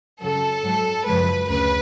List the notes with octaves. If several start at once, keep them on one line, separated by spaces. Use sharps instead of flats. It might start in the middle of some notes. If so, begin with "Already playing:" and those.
F#2 C#3 F#3 A4
G#2 F#3
F#2 C#3 F3 G#3 B4
D2 C#3 B4